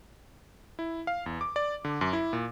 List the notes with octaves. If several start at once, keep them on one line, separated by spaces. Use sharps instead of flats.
E4
F5
E2
D6
D5
D3
F#2
E4
A#2